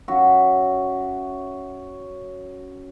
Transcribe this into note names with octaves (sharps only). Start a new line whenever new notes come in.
F#2 F#4 E5